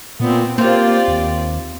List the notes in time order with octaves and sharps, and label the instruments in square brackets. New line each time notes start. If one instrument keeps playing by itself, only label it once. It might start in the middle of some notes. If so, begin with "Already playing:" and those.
[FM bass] A#2 [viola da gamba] B3 C4
[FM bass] A#3 [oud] C4 F5 [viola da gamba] F4 G4 D5
[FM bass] D#2